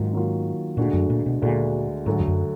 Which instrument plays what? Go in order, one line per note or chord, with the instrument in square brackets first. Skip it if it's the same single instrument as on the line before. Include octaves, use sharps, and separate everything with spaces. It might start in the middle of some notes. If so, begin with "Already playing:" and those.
Already playing: [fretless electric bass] G#2 [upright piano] D#3 F#3 A#3 F4
[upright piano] D#3 F#3 A#3 F4
[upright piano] D2 D3 G#3 D4 F#4 [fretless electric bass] A#2
[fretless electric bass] F#2
A#2
B2
[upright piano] D2 D3 G#3 D4 F#4 [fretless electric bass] A#2
[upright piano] D2 D3 F#3 [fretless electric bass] G#2
[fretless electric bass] F2
F#2